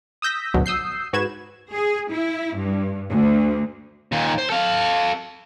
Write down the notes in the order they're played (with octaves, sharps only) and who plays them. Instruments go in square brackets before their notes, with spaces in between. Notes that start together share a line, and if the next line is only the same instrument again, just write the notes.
[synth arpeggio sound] D#6 E6 G6 A#6 B6
D2 G#2 B2 F#3
D#6 E6 G6 C7
G#2 F#4 B4 G#6 E7
[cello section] G#4
E4
G2
D2
[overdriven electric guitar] D#2 A#2
C5
A4 F5